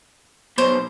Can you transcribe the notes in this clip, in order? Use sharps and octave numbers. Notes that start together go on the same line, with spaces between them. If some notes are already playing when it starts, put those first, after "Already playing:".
B1 B2 C5